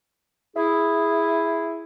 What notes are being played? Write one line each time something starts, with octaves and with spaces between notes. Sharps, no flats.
E4 G#4